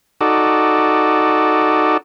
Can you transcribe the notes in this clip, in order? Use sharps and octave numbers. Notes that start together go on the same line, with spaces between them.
D#4 F#4 A4 D5